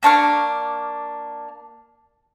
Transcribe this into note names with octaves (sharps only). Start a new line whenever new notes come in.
A#3 D4 C#6 F6